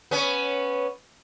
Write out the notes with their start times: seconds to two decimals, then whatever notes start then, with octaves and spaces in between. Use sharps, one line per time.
0.11 B3 C#4